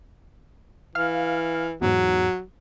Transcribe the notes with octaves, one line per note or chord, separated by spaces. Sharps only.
E3 F5 F6
E2 G#2 F#3